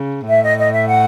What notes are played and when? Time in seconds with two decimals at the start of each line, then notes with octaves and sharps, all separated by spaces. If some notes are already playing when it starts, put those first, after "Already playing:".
Already playing: C#3
0.29 A2 E5
0.44 D#5
0.58 D#5
0.73 E5
0.88 F#5